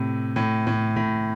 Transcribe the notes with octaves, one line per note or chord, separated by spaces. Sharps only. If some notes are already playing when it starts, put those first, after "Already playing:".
Already playing: A2 C3
A2
A2
A2